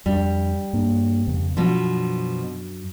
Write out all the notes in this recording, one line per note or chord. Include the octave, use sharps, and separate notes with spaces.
F2 G3 D4
G2 A#3 D4
F2 C#3 B3
F#2 B2 F3 F#3 D4